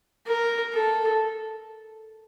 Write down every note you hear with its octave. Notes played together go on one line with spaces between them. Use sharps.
A#4
A4